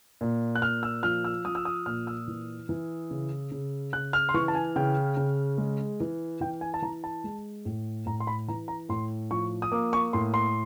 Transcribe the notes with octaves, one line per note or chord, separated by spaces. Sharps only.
A#2
F#6
A#2 F6
E6
F3 F6
E6
F3 D#6
E6
D#6
A#2 F6
E6
E3
E3
C#3
C#3
C#3 F#6
F6
C6
E3 C#6
A5
G#5
C#3 G5
C#3
G#3
E3
E3 G5
G#5
A5
E3 A#5
A5
G#3
A2
A2 A#5
C6
B5
E3 A#5
A#5
A2 C6
F3 C#6
D#6
A#3 D6
C#6
A2 C6
C6